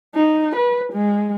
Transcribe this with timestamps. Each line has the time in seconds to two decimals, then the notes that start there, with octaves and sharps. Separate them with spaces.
0.14 D#4
0.56 B4
0.93 G#3